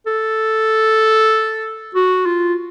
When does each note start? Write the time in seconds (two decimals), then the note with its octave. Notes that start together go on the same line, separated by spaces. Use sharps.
0.06 A4
1.95 F#4
2.26 F4